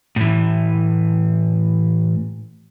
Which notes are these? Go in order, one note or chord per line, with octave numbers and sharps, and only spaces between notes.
A2 E3